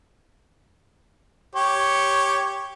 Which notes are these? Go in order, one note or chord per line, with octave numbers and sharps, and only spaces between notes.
G4 C#5